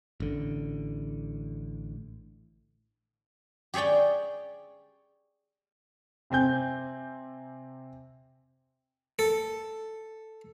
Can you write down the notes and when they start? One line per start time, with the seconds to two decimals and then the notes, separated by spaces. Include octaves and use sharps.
0.20 A1 D3
3.74 G4 G#4 C#5 D5 G5
6.30 C3 C4 G#5 G6
9.19 A4